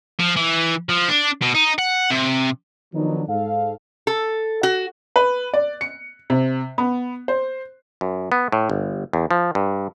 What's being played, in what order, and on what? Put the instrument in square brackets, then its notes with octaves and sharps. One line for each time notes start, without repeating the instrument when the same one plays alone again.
[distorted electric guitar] F3
E3
F3
D4
B2
D#4
F#5
C3
[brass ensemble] D#3 F3 F#3 B3 D4 D#4
G#2 A4 F5
[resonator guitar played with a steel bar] A4
F#4
[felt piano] B4
D5
C#7
C3
B3
C5
[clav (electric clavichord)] F#2
B3
A2
G1
E2
F3
G2